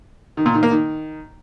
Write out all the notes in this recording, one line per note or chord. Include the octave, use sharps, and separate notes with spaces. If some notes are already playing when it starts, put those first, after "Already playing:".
D#3
A#2
D#3
A#3
D#3